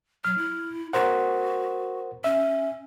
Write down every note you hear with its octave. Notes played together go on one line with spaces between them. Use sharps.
F#3 F6
E4
F#4 A#4 C5 F#5
C#4 E5